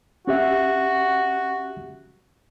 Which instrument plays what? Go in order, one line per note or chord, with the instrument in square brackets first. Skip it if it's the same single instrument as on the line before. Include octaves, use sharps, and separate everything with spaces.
[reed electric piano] C#4 G4 E5 [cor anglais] F#4